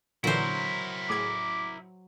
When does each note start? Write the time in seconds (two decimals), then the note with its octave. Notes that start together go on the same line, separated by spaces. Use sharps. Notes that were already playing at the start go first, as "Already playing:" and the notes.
0.24 A#2 D3 E3 F#3 E4 A#4 C5
1.10 A2 G#4 D6 G#6